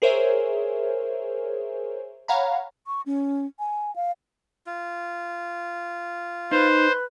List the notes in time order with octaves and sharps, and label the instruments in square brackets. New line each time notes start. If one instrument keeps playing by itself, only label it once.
[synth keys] G#4 A#4 C5 C#5 E5 G#5
C#5 F5 F#5 G#5 A#5 B5
[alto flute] C#6
C#4
G#5
F5
[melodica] F4
[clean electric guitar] D#4 [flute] B4 [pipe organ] C5